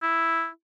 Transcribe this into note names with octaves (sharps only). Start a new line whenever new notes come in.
E4